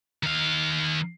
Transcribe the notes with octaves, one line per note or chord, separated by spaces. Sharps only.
D#3 F5